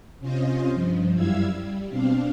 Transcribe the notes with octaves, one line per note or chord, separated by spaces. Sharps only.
C3 C#4 F4 C5 D#5
G2 F3
F#2 G3 E4 F5 E6 G#6
G3
B2 C4 D4 F5